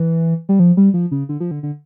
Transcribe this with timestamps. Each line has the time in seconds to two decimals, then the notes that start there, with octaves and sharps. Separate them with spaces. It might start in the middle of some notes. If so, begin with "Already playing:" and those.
Already playing: E3
0.49 G3
0.60 F3
0.77 G3
0.94 F3
1.11 C#3
1.29 D3
1.40 F3
1.51 D3
1.63 D3